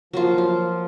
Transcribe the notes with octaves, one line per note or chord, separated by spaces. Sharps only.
F3 F#3 A#3 F4
F4